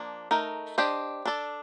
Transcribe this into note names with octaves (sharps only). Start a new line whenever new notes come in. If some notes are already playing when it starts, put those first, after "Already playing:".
Already playing: F3 A#3 D4
A3 D#4 A#4
D4 G4 C5 D#5
D4 A4 D5